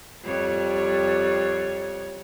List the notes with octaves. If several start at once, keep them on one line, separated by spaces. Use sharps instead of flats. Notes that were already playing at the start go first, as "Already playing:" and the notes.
F2 G3 C#5